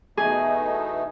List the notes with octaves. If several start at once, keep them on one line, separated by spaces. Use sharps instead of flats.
E2 B2 A3 D#4 G#4